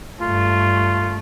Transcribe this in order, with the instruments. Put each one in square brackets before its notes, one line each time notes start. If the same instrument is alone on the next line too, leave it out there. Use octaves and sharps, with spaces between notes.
[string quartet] G2 A3 [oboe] F4